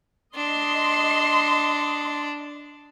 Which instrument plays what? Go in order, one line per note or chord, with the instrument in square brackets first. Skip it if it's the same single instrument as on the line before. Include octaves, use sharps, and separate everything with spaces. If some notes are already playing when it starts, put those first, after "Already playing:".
[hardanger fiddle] D4 [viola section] D#5 C6